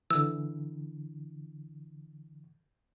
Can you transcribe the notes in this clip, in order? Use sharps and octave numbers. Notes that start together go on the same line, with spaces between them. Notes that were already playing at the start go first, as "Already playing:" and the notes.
D3 E3 E6